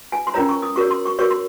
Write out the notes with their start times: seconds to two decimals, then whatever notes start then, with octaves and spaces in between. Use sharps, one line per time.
0.12 G#5
0.27 C6
0.34 C#4 F4 A#4 C#5 A#5
0.49 C#6
0.62 D#6
0.76 F#4 A#4 C#5 C#6
0.91 C6
1.05 C#6
1.19 F#4 A#4 C#5 C#6
1.30 C6